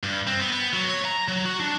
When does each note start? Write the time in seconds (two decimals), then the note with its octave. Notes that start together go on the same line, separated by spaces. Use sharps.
0.03 G2
0.27 C4
0.40 B3
0.52 B3
0.73 F#3
0.88 C#5
1.05 A#5
1.28 F#3
1.46 F#4
1.60 D4